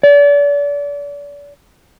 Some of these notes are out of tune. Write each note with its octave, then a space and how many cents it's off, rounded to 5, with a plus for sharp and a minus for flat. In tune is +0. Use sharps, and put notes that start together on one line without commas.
D5 -35